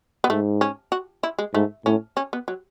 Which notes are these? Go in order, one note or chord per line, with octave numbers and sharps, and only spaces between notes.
B3
G#2 A3
C#4
F#4
E4
G#3
G#2 A3
A2 C#4
C#4
B3
F#3